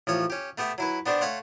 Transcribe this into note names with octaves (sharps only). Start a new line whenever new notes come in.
A1 F3 C#5
C#4 G4
A3 B3 G4 E5
F#3 E4 B4
B3 D4 G4 C5 D5
A3 C#5 F5 F#5 C6